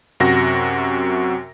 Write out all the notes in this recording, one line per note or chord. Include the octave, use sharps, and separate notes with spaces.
F#2 C3 F#4 A#6